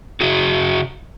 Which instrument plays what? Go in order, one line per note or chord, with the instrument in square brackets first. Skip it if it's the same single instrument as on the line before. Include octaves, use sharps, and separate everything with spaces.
[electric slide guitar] C#3 F#4 G#4